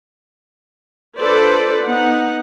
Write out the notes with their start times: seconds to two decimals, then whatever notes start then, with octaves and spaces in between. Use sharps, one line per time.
1.20 D4 F4 A4 B4 C5 D5
1.84 B3 D#4 F#5